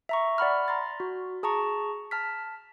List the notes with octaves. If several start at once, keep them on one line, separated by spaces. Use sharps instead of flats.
E5 A#5 C#6
D5 F#5 B5 F6
A#5 C6 A6
F#4
G#4 A5 A#5 C#6
A5 F6 B6